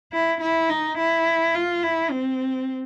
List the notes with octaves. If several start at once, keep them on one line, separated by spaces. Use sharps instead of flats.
E4
E4
D#4
E4
F4
E4
C4